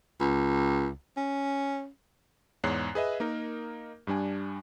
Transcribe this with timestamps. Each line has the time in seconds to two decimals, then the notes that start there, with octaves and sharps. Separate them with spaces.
0.20 C#2
1.17 C#4
2.64 E2 G#2 C#5 F#6 C7
2.95 G#4 B4 D#5 E5
3.20 A#3 D#4 A#4
4.07 G2 G3 D4 G#5